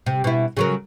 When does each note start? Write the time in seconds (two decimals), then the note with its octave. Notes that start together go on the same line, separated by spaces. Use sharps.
0.06 C3
0.24 B2 E4
0.57 C#3 F#3 A#4